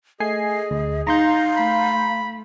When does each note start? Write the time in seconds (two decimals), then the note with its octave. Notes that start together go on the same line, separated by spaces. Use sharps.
0.20 A3 G#4 D#5 G#5 C7
0.71 D2
1.07 D#4 F5 A#5 C6 G6
1.56 A3 B5